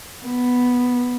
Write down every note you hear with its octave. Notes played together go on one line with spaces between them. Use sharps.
B3